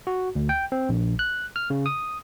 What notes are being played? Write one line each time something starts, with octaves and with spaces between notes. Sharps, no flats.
F#4
D2
G5
C4
A#1
F#6
F6
C#3
D#6